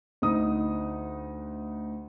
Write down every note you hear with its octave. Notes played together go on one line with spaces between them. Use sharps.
D2 D#4 D#6